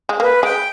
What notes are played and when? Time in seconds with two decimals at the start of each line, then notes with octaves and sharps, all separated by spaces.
0.09 G#3
0.20 A#3 B4
0.43 G#3 G5